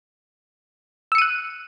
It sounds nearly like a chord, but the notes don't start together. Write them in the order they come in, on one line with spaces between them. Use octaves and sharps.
E6 C#7 D#7 F#6